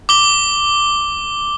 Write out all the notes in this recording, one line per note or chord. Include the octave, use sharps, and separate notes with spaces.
D6 G7